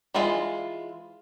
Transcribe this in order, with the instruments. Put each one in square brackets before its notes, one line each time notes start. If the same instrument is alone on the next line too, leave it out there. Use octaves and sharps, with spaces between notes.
[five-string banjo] E3 G#3 E4 F4